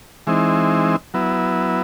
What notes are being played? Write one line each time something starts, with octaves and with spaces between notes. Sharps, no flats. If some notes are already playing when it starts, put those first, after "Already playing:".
E3 G#3 C4 D#4
F#3 B3 E4